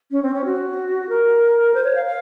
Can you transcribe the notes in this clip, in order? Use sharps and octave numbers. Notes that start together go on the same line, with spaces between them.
C#4
C4
C#4
F#4
A#4
C5
C#5
F5
F5